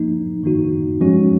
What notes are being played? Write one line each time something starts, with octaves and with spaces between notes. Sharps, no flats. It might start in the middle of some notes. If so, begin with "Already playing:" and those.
Already playing: F3 A#3 D#4
D#3 A#3 D#4 F#4
F3 G#3 C#4 F#4